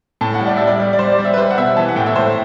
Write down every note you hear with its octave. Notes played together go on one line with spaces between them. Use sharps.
A2 A5
F#5
G3
D5
G3 E5
D5
G3
D5
G3 C5
D5
G3
E5
B4
G3 C5
F#5
B2 E5
E3 A5
F#5
A2 G5
E5
A2 C5